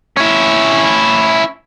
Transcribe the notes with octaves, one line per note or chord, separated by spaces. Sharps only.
C#4 E4